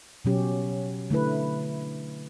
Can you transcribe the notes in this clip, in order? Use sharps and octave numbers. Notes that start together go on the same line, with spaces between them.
B2 F#3 C#4 G4
D3 A3 E4 B4